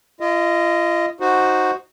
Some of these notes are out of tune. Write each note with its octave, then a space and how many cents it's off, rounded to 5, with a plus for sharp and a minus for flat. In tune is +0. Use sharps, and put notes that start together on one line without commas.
F4 -40 D#5 +0
D#4 +0 F#4 +0 C5 +5